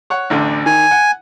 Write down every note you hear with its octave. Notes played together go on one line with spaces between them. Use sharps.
C#5 F#5
A1 D2 D3
D#3 G#5
F#5